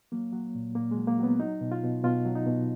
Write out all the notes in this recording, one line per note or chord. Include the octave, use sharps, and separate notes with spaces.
F#3 A#3
F#3
A#2
A#2 A#3
G#3
F#3
A#3
F#3 B3
F#3 D#4
B2
F4
B2
B2 F4
F#3
D#4
B2